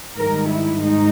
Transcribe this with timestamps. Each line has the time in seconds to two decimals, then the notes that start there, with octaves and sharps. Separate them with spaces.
0.16 G#2 D#3 G3 A#4
0.49 E4
0.81 G#2 D#4